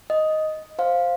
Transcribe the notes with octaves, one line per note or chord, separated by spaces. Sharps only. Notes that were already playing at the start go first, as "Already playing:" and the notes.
D#5
C5 F5